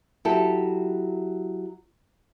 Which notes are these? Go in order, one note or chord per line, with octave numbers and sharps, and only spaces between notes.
F#3 E4 G4 A4